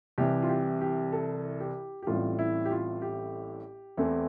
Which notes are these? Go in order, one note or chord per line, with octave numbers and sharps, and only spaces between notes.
C2 C3 E3 G4
F4
G4
G4
A4
G4
G4
A1 A2 G3 C4 F4
E4
G4
F4
G4
E2 E3 A3 C4